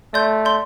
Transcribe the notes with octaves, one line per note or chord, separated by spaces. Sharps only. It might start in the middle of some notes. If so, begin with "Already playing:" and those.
A3 D5 C6 G6
D5 C6 G6